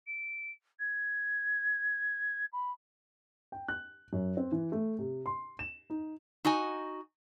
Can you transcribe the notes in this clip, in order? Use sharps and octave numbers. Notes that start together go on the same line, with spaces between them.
D7
G#6
B5
G5
F#6
F#2
C4
E3
A3
C3
C6
E7
D#4
D#4 F#4 D#5 G#5